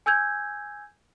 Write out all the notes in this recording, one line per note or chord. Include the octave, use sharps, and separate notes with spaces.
G#5 E6 G6 G#6